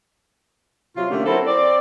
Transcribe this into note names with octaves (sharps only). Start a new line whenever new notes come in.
C3 F#3 F4
D3 A3 A#3 C#4 G4
F#3 C4 E4 A4 A#4
C4 D5